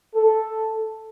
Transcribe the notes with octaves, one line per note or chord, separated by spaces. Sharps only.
A4